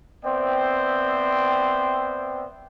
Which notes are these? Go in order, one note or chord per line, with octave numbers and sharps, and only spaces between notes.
B3 C4 C5 D5 E5 G5